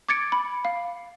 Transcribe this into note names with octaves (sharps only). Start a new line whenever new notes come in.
D6 G#6 A6 C#7 D7
B5
F5